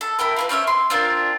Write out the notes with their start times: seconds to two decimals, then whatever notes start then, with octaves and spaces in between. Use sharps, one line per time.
0.01 A4
0.19 E4 A#4 G5 B5
0.36 F4 G#4 B4
0.49 C4 C#4 C#5 E5
0.67 C6
0.90 C4 D4 F4 A#4